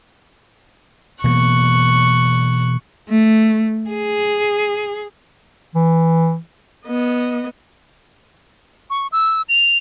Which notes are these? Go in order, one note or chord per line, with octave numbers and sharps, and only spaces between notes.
B2 E3 A#3 C#6 F#6
A3
G#4
E3
B3 D#5
C#6
E6
F7